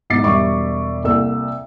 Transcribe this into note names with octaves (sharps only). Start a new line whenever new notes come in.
B1 G#2 D6 A6 C7
E1 G3 E5 C#6 D6
C2 A#3 A4 E6